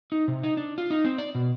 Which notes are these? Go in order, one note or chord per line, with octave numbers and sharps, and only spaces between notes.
D#4
C3
D#4
D4
F4
D#4
C4
D5
B2